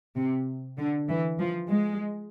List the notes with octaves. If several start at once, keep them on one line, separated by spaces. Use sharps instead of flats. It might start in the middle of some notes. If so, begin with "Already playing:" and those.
C3
D3
E3
F3
G#3